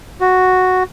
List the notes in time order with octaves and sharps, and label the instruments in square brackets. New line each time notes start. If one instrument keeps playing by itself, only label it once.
[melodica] F#4